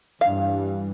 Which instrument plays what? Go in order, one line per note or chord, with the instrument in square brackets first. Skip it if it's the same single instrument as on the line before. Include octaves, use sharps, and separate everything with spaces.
[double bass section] G2 E3 G3 [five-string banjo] F5